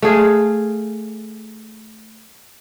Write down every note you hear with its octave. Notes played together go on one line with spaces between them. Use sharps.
A3 G#4 F5